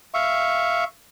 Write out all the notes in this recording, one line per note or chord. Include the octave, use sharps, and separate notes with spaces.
E5 F5 C#6